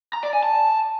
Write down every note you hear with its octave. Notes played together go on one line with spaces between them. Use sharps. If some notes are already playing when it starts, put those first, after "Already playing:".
A#5
D5
G#5
A5